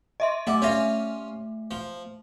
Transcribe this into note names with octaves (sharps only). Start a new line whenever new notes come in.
D#5 E5 C6
A3 E4 D#5 F#5 D6
C#4 F4 D5 E5
F3